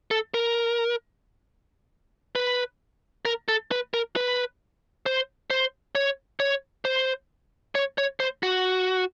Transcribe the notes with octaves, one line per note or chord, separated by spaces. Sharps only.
A4
A#4
B4
A#4
A4
B4
A#4
B4
C5
C5
C#5
C#5
C5
C#5
C#5
C5
F#4